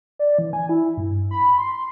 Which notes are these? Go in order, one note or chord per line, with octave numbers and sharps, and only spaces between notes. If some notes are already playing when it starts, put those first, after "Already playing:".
D5
E3
G#5
E4
G2
B5
C6